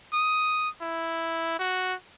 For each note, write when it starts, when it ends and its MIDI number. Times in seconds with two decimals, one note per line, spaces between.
0.13 0.69 87
0.82 1.57 64
1.59 1.94 66